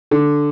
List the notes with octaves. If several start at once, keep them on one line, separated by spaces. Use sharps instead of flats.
D3